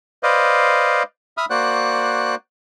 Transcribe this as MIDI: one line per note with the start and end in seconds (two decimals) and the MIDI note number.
0.23 1.03 71
0.23 1.03 72
0.23 1.03 74
0.23 1.03 75
0.23 1.03 77
1.37 1.45 76
1.37 1.45 83
1.37 1.45 87
1.37 1.45 89
1.50 2.35 58
1.50 2.35 66
1.50 2.35 72
1.50 2.35 74
1.50 2.35 78
1.50 2.35 90